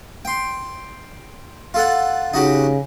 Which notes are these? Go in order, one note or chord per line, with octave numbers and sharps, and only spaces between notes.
G5 C6
F4 A4 F#5
C#3 D#4 F#4 G4